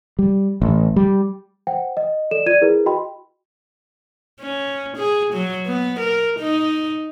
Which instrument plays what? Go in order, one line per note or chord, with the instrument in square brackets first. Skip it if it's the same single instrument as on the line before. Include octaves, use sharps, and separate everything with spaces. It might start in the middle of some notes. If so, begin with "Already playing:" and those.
[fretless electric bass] G3
A1
G3
[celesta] C5 F#5 G5
D#5
A4 D5 E7
F4 D5 G#6 D#7
E4 G#4 A#4 B4
F#4 D#5 G5 B5 C6
[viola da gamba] C#4
G#4
F#3
B3
A#4
D#4